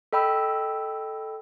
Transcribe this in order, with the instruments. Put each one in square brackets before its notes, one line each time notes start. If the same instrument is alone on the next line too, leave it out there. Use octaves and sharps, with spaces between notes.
[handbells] A4 D#5 G5 B5 E6